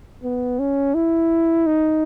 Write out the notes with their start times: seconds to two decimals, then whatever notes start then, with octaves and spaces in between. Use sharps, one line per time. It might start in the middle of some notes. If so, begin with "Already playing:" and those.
0.23 B3
0.59 C#4
0.95 E4
1.66 D#4